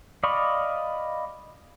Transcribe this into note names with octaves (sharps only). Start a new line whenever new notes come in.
D5 D#5 F5 B5 C#6